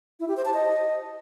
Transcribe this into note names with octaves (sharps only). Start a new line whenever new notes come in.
E4
G4
C5
A5
D#5